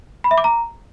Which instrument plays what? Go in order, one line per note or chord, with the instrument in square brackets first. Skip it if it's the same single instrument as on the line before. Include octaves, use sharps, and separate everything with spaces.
[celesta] B5
E5
D6
A#5